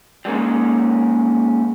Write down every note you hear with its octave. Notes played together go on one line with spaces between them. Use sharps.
G3 G#3 A#3 C#4 D#4